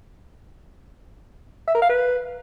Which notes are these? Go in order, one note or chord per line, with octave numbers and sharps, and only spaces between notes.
E5
A#4
F5
B4